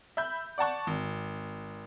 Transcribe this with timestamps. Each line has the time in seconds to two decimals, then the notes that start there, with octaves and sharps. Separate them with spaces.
0.17 E5 B5 G6
0.58 D5 F#5 A5 C#6
0.87 G#1